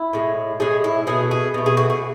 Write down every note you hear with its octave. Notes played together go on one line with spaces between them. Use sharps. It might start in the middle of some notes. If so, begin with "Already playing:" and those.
Already playing: E4
A2 G#3
A2 G#3 G#4
E4
B2 A3 G#4
G#4
B2 A3
G#4
F#4
G#4